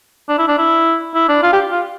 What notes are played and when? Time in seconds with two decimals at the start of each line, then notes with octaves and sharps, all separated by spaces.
0.29 D4
0.38 E4
0.48 D4
0.58 E4
1.14 E4
1.29 D4
1.43 F4
1.53 G4
1.71 F4